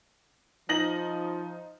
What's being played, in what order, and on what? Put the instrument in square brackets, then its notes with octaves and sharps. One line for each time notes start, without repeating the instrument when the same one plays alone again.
[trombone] F3 [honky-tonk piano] D#4 A#6 F#7